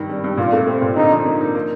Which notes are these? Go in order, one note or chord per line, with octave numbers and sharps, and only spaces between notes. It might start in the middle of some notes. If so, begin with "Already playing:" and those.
Already playing: G2 D#3
G3
G2
A#2 F4
A3
C4
A#2
D3 D#4
F3
A#3
D#4
A#3